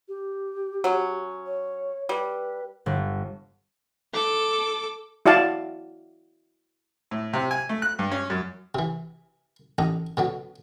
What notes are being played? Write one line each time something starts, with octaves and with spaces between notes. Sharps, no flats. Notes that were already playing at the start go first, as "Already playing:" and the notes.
G4
F#3 C#4
C#5
G3 B4
G1
A4 D6
E4 F#4 D5 F5 A5
A2
C3
G#5
A3
F#6
G2
C#4
F#2
C3 E3
A1 D4 D#4 A#5
B2 D3 F#3